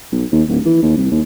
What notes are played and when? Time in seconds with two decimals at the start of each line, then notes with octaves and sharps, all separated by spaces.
0.12 B1
0.32 D#2
0.48 D1
0.66 E3
0.82 D#2
0.97 C2
1.11 D#2